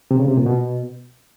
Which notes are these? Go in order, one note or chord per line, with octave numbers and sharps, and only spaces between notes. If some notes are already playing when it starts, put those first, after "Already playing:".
C3
C#3
C3
A#2
B2